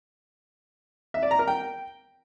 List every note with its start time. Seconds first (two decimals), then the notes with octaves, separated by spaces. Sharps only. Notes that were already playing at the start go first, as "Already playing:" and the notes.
1.14 E5
1.23 D5
1.31 A#5
1.39 A#4
1.47 G5